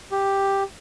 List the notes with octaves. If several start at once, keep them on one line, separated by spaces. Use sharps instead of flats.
G4